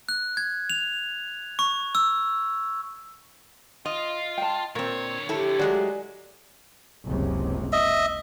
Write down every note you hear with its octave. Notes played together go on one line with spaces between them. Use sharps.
F#6
G#6
F7
C#6
E6
F4 D#5
G5 A5
A#2 D3 C4 A#4 C#5
E4 G4 A4
F#3 G#3 A3 D5 G#5
F#1 C#2 C3
D#5 E5